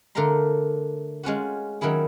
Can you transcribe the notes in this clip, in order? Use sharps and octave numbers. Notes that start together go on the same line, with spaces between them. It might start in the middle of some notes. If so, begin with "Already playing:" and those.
D3 A3 A#4 F5 A#5 C6
G#3 C#4 F4 F#4
D#3 F#3 C#4 E4 G#4